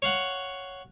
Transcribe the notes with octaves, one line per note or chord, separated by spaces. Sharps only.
C#5 F5 F#5